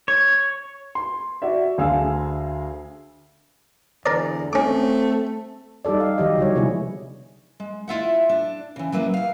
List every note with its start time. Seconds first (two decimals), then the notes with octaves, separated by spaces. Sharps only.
0.08 C#5
0.95 C6
1.42 F#4 D5 E5
1.78 D2 D3 G#4 F5 E6
4.06 E2 D3 A#4 D5
4.53 A3 C4 C#4 D6
5.85 G3 D#4 G4 A4 D5
6.00 F5
6.18 D#3 F#3 G4 D#5
6.38 D3 F3 G3 C#5
6.55 C3 G#3 B3 E4 G#4
7.60 G#3
7.88 E4 F4 E5 F#5
8.29 D4
8.76 C#3 E3
8.92 F#3 A#3 E4 G#4 B4 D#5
9.14 E4 F5